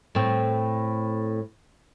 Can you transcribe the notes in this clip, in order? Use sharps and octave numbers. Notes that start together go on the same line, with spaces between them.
A2 C4